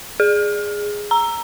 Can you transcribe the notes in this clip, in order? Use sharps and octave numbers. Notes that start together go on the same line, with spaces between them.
G#4
A#5